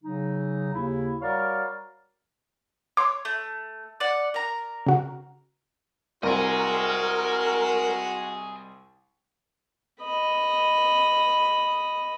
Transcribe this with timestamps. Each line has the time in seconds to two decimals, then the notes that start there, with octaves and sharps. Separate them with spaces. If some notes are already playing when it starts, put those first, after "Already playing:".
0.03 C#3 F#3 D#4
0.73 D#2 C#3 E4
1.21 G3 F#4 A#4 C#5 D5 F5
2.97 C#5 C6 D6
3.25 A3
4.00 D5 F#5
4.34 A#4 A#5
4.86 C#3 F#4
6.23 C2 F#4 A#4 D#5 G#5
10.02 D#5 B5